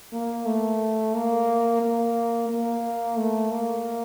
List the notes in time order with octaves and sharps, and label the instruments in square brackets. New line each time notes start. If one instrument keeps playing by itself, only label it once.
[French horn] A#3
A3
A#3
A#3
A#3
A3
A#3